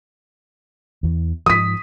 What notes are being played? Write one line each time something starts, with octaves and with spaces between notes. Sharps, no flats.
E2 E3
G#2 F3 D#6 B6